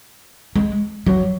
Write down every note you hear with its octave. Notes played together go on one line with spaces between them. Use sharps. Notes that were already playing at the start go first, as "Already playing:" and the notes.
G#3
F#3